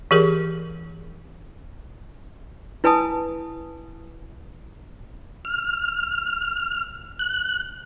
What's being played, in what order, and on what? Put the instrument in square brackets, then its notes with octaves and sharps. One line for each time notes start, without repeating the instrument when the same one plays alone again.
[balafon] E3 G4 G#4 A#4
[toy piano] E4 B4 G#5 A5 D#6
[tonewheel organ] F6
F#6